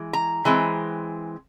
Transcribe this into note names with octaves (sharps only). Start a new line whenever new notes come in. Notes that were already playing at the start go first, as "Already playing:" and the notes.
Already playing: E3 G#3
A#5
E3 G#3 C4